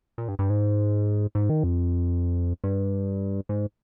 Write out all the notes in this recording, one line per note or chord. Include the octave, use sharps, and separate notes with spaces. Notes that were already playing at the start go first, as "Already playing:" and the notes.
A#2
G2
G2
G#2
G#2
D#3
F2
G2
G#2